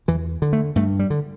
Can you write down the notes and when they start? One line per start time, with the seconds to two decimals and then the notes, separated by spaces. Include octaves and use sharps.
0.08 E2 E3
0.42 D3
0.53 A3
0.76 G2 A3
0.99 G3
1.10 D3